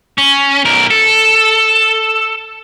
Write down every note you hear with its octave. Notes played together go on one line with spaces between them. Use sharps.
C#4
B1 A#4
A4